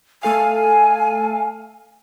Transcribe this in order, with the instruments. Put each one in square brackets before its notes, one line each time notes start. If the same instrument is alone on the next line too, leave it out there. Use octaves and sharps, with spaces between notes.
[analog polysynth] A3 A4 F5 [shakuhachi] G#5